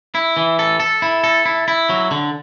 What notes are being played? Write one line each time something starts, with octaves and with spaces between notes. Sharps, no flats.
E4
E3
A4
A4
E4
A4
E4
E4
F#3
D3